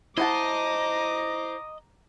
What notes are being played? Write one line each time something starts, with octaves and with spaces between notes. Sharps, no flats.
E4 C5 D#5 F#5 A5 A#5 D6